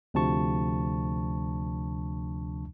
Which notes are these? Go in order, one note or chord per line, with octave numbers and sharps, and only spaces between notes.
D2 C3 F3 D4 A5 C#6